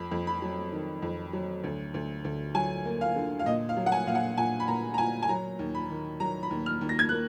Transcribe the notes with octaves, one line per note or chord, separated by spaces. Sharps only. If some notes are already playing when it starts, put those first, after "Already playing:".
Already playing: F2 B5
F2
B5
F#3
D#3
F2
F#3
D2
D2
D2
F#3 G#5
A#3
F5
D3
F5
A#2 D#5
F5
F#3
F#5
G#5
A#2 F5
F#5
A#2 G#5
B5
A#2 A#5
A#5
A#2 G#5
G#5
F#3 A#5
D#2
B5
D#3
F#3 A#5
B5
D#2
F6
D#2
A#6
G#6
A#3 F#6